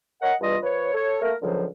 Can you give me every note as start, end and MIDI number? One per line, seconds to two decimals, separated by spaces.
0.22 0.34 70
0.22 0.34 73
0.22 0.34 75
0.22 0.34 78
0.41 0.57 40
0.41 0.57 43
0.41 0.57 55
0.41 0.57 65
0.41 0.57 75
0.63 0.91 53
0.63 0.91 71
0.63 0.91 73
0.94 1.20 69
0.94 1.20 73
1.22 1.34 57
1.22 1.34 58
1.22 1.34 70
1.42 1.67 37
1.42 1.67 50
1.42 1.67 53
1.42 1.67 54